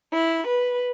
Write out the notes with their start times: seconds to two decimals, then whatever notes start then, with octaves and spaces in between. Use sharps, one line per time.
0.13 E4
0.47 B4